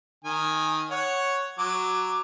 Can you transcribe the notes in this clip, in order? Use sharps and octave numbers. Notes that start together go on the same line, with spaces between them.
D#3 G#5
C#5 F#5
F#3 D6